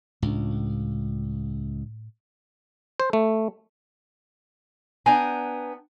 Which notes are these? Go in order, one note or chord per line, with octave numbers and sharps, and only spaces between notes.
C#2 A2 D4
C5
A3
B3 D4 G5 G#5 A#5